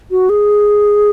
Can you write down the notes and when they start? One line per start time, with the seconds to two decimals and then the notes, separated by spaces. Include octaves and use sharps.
0.11 F#4
0.30 G#4